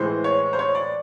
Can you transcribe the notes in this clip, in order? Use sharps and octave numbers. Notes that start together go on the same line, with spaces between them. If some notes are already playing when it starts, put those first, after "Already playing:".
Already playing: A2 E3 G#3 C5
C#5
C5
C#5
D5